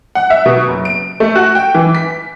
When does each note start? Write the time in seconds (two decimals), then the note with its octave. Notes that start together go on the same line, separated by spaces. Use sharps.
0.15 F#5
0.30 E5
0.46 B2
0.68 F#1
0.85 D7
1.20 A3
1.35 F#4
1.55 G5
1.75 E3
1.95 B6